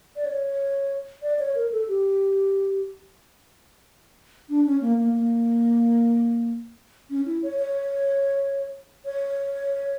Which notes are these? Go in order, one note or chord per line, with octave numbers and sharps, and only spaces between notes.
D5
C#5
D5
C#5
A#4
A4
G4
D4
C#4
A#3
A#3
A#3
C#4
E4
C#5
C#5
C#5